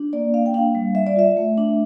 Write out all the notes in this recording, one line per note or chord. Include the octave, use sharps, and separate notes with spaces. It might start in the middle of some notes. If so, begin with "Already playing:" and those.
Already playing: D4
A#3 D5
A#3 F5
G5
D4 F5
G3
G3 E5
D5
F4 E5
A3
D4